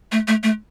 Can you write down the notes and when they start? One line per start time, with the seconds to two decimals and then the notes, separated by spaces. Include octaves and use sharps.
0.12 A3
0.28 A3
0.43 A3